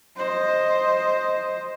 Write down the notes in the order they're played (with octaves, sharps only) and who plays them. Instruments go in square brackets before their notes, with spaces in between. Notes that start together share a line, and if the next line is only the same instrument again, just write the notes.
[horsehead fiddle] C5 D#5